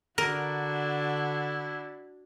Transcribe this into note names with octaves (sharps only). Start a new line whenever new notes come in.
D3 D4 E4 F#4 A#4